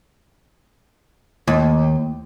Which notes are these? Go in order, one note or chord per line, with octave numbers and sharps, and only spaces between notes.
D#2